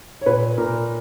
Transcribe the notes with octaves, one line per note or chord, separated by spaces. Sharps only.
C#5
A#2 B4
A#2 A#4